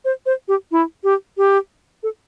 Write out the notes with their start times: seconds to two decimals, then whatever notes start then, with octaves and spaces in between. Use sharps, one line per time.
0.05 C5
0.26 C5
0.48 G4
0.71 E4
1.04 G4
1.37 G4
2.03 A4